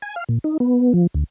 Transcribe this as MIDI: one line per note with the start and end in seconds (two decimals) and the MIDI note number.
0.02 0.15 80
0.16 0.24 77
0.29 0.38 46
0.44 0.57 63
0.60 0.93 59
0.94 1.07 53
1.14 1.24 38